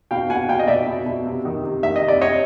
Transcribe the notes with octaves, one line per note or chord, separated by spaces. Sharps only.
B2 F5 G5
B2 F#5 G#5
B2 F5 G5
D#5
B2 D5 E5
B2
B2
C3
D#3
C3
D#3 E5
D#5
C3
D5
C3 C#5 D#5